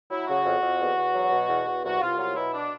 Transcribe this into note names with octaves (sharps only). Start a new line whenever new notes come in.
F#3 E4
C#3 F#4
F2
F2
E2
E2
F#3
B2
E2
E2
C2 F#4
C2 F4
F#3 F4
B2 E4
D4